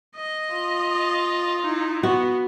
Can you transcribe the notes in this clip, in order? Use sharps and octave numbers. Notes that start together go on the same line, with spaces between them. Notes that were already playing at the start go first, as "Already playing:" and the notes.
D#5
F4
D#4 E4
B3 F#4